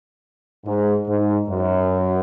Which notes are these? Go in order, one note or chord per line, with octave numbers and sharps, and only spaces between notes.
G#2
G#2
F#2